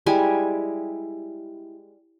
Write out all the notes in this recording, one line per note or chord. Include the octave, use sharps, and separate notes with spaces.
G3 G#3 E4 G#5